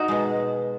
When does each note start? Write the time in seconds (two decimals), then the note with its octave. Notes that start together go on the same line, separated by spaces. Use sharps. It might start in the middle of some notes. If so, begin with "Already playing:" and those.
Already playing: D#4 F#4
0.08 B2 G#3